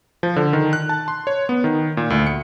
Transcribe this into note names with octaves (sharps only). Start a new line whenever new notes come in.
F3
D3
D#3
F#6
A5
C6
C#5
B3
D#3
A#2
D2
C#7